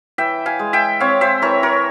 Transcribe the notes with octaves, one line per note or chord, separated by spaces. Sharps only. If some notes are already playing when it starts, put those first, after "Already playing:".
E3 E5 G5
F5 G#5
G#3
E5 G5
C4 C#5 F5
C5 E5
E3 A#4 C#5
A#4 C#5